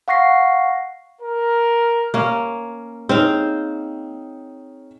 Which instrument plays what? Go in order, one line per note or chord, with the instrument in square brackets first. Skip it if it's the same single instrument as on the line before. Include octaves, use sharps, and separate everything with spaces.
[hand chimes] F5 F#5 C#6 A#6 C7
[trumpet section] A#4
[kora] A#3 C#4
[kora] C4 C5 F5 [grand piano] C#4 D#4 G#4